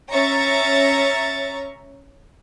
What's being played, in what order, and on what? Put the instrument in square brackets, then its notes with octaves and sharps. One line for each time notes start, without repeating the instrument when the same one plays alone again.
[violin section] C#4 C#5 E5 A#5 C#6 A6